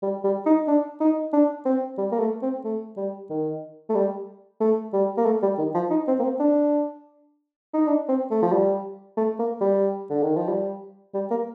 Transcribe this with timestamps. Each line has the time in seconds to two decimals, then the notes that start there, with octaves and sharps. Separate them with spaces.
0.03 G3
0.24 G3
0.46 D#4
0.68 D4
1.01 D#4
1.33 D4
1.65 C4
1.98 G3
2.12 A#3
2.20 A3
2.42 C4
2.64 A3
2.97 G3
3.30 D#3
3.89 A3
3.95 G3
4.60 A3
4.93 G3
5.17 A#3
5.26 A3
5.42 G3
5.58 D#3
5.75 F3
5.90 D#4
6.08 C4
6.19 A#3
6.23 C4
6.40 D4
7.74 D#4
7.87 D4
8.09 C4
8.31 A3
8.42 F3
8.52 G3
9.17 A3
9.39 A#3
9.61 G3
10.10 D3
10.23 D#3
10.37 F3
10.49 G3
11.14 G3
11.31 A#3